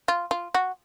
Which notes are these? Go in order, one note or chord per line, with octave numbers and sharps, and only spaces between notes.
F4
F4
F#4